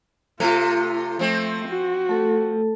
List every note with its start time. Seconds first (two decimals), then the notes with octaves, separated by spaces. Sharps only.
0.40 C3 A3 F4 A4
1.19 F3 A3 C4
1.68 F#4
2.09 A3 A4